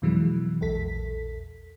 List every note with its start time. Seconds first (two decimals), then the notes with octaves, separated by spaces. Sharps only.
0.02 F2 B2 E3 F#3 G#3
0.61 A#1 E2 A4 B6